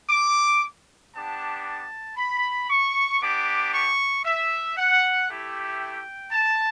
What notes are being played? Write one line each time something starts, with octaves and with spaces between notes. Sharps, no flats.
D6
B3 D4 G4 A5
A5
B5
C#6
B3 D4 G4 D6
C#6
E5
F#5
A3 E4 G4
G5
A5